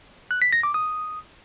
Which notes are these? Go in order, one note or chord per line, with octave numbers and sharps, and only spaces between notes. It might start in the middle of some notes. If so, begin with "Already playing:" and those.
F#6
B6
A#6
D6
D#6